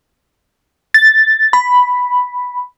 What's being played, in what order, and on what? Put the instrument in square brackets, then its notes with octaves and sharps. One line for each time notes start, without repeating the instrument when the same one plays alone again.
[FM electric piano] A6
B5